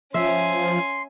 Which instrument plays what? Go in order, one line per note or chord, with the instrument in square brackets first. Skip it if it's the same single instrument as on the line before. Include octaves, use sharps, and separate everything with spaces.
[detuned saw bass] F3 [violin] C#4 G#5 [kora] E5 [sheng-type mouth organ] C6